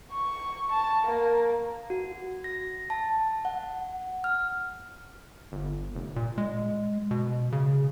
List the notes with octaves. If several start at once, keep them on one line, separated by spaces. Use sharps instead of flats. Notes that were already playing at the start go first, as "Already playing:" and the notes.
C#6
A5
A#3
F#4
A#6
A5
F#5
F6
G1
F1
A#2
G#3
B2
C#3